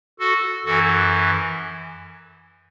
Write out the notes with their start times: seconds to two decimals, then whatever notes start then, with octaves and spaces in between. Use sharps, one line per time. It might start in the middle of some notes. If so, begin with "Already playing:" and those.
0.19 F#4 A4
0.65 F#2 E3 F#4 A4